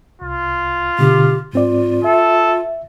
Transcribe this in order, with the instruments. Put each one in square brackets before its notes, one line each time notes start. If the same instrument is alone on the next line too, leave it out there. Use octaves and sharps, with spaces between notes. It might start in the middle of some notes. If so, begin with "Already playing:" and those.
[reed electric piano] C2 [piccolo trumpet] F4
[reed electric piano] B2 D3 [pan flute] G4
[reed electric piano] G#2 C4 D5 [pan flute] F4
[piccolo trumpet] A4 [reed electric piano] E5